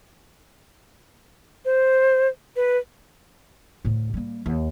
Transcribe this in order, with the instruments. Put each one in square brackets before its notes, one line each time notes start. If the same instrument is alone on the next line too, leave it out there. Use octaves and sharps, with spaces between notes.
[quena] C5
B4
[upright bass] D2 A2
G3 A#3
D#2